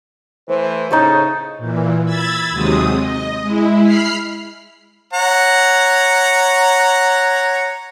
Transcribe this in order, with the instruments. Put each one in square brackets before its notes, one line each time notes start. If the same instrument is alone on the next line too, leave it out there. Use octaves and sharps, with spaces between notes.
[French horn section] E3 A3 C5
[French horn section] A2 C#3 [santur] D#4 C#5 A5
[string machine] A#2 E3
B5 E6 G#6 A6
D#2 C3 F#3 G#3 C4 D#6
D#5
G#3 E4
B5 F6 C7
[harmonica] C#5 F#5 A#5